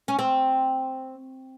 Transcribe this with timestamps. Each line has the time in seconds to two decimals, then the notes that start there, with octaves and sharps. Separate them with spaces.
0.08 C#4
0.19 C4